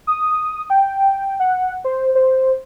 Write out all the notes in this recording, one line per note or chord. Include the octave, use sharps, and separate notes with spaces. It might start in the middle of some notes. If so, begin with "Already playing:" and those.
D#6
G5
F#5
C5
C5